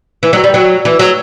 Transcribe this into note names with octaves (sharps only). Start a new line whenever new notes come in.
E3
F#3
G3
F#3
E3
F#3